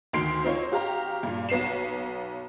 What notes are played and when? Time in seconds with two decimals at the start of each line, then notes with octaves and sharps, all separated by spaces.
0.13 D2 D#3 C6 C7 D7
0.44 C4 D#4 F4 C5 C#5
0.72 F#4 G4 F5 A#5
1.23 G2 A#2
1.49 B1 B3 C7 E7